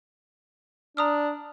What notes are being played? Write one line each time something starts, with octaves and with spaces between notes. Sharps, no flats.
D4 A#5 D#6 F6